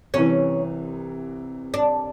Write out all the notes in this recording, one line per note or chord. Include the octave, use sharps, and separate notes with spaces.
C2 C3 E3 C#4
D4